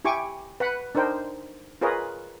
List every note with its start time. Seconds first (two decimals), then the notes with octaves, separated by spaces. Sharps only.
0.05 E4 G4 G#5 C#6 D6
0.60 B4 F#5 B5
0.95 D4 D#4 A#4 C5 G5
1.81 F4 G#4 A#4 B4 C#5 D#5